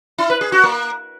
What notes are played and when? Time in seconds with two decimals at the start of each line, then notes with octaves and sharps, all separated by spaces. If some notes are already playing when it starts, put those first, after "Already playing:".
0.18 E4
0.30 B4
0.41 G#4
0.52 F#4
0.63 A#3